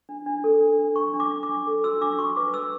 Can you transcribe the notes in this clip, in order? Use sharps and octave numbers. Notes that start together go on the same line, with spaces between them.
D4
D4
A4
D4
D4
D4 C#6
D4
D6
D4
D6
D4
A4
F#4 E6
D4 D6
F#4 C#6
B4 D6
B4 E6